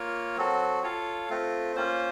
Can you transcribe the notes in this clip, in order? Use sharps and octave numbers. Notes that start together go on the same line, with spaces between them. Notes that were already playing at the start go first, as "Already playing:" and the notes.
Already playing: A#3 F4 A#4 C#5
F#3 C4 F#4 A4
F4 A4 C#5 F5
A3 C4 F4
A#3 C#4 F4 C5